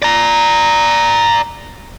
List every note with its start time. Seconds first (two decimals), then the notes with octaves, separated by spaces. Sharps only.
0.02 D5 A#5